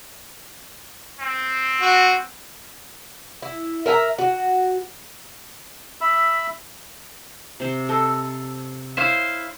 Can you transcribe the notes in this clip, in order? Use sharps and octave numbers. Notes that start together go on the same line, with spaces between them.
C4
F#4
E4
A#4 E5 G#5 A#5
F#4
E5 B5 E6
C3 C5
A4 C5 D#5
E4 C5 C#5 F5 C#6